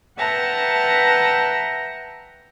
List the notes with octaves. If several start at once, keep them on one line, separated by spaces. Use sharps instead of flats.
B4 E5 F#5 G5 A5 A#5